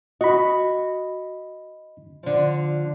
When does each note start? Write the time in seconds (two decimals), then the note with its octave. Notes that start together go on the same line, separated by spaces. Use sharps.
0.21 F#4 D#5 B5
2.23 D3 F3